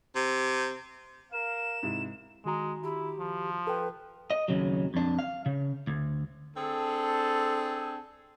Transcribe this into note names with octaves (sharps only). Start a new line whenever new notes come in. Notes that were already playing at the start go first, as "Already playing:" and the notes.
C3
A#4 F5 E7
G#2 C3 E4
D#3 G#3 F#4 A#5
E4 G4
F3
A4 B4 G5
D#5
D#2 C#3 F#3
F2 D4
F5
C#3
D2
C4 D4 G#4 A4